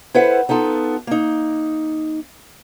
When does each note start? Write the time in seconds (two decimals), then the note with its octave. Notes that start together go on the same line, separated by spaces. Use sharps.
0.14 E4 A4 B4 C5 F#5
0.49 B3 D#4 F4 A4
1.07 A#3 D#4